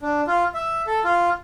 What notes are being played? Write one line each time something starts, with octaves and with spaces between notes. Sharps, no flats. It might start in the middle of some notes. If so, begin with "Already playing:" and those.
D4
F4
E5
A4
F4